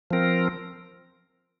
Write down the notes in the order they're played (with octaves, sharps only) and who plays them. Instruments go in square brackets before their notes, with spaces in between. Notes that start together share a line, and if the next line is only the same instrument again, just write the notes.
[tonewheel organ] F3 C4 A#4